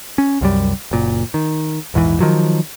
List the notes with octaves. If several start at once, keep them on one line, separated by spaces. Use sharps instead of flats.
C#4
C2 F#2 G3
F#1 A#2
D#3
A#1 E2 G#2 E3
D#3 F3 F#3